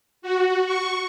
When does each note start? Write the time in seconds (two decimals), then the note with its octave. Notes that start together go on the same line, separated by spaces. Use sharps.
0.22 F#4
0.66 C#6